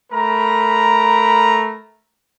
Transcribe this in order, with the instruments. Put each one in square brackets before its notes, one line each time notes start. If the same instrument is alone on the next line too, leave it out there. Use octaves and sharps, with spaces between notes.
[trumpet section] A3 A#4 A#5 B5